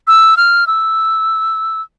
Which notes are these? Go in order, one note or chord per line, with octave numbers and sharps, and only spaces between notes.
E6
F6
E6